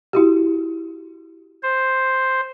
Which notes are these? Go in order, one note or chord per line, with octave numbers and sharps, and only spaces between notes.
E4 F#4 G4
C5